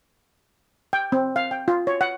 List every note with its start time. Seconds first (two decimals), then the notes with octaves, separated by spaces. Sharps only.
0.93 G5
1.12 C4
1.36 F5
1.51 G5
1.68 F4
1.87 C#5
2.01 F#5